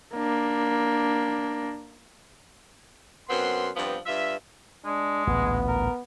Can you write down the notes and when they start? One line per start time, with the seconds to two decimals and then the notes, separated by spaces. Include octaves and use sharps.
0.15 A#3 D4
3.29 F#2 B3 C4 C6
3.76 G2 F3 B3 C4
4.06 G2 F4 E5
4.85 G#3 D4
5.27 A1 D2 A#2 B3
5.68 A#4